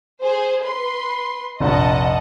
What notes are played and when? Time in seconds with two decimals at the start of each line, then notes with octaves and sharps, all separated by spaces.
0.21 G#4 C5
0.63 B4 C6
1.60 F1 A#1 D#5 F#5 A5